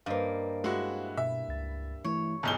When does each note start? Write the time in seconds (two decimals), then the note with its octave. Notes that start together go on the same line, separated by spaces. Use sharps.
0.06 G2 A#3 C5 D#5 F5
0.64 G#3 E4 F#4
1.17 B2 E5
1.48 C#2 A6
2.04 E3 A3 E4 C#5
2.43 E1 B1 A5 G6 G7